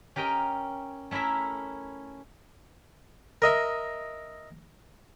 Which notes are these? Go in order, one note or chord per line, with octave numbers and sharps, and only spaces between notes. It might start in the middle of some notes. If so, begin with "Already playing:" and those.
C#4 G4 A#4 D#5 G5
A3 C#4 E4 A#4 E5
A#4 D#5 E5